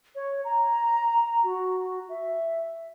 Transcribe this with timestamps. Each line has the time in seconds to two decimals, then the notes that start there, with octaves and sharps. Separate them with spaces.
0.15 C#5
0.45 A#5
1.44 F#4
2.09 E5